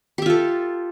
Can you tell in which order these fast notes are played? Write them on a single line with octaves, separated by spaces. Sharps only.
G4 E5 F4 A4